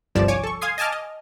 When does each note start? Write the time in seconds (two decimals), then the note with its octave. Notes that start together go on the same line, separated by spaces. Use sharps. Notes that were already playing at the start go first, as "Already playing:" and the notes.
0.15 G1 C2 G2 F3 D5 E7
0.28 C#5 G#5 D6
0.43 A4 C#6
0.61 F5 G#5 C6 D#6 G#6 C7
0.78 D#5 G#5 A5 D6 F6
0.92 D#5